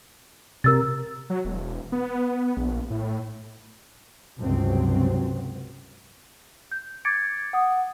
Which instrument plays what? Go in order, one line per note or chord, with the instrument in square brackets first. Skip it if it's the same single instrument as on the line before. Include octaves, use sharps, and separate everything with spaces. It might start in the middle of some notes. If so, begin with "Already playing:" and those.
[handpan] C3 A#4 [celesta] E6 A6
[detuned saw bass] F#3
E1
B3
A#1
A2
[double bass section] C#2 G2 C3 F#3 C4
[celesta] G6
D6 G#6 A6 C#7 D7
F#5 D#6